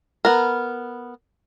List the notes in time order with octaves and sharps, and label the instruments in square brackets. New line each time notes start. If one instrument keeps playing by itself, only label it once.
[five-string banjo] B3 A#4